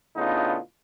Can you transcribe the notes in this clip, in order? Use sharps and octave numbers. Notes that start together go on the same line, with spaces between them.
A2 C#3 B3 D4 D#4 F4